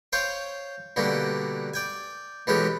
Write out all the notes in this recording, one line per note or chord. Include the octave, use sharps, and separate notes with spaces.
C5 C#5 F5 G5
B2 D3 G3 A#3 F#4
D5 G5 G#5
B2 E3 G#3 C#4 G4 A4